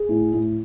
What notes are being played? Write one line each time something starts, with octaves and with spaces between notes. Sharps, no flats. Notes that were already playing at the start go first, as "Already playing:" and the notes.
Already playing: G#4
A2
A2